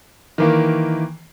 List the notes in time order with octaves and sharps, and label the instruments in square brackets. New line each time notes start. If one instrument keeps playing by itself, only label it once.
[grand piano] D#3 E3 A#3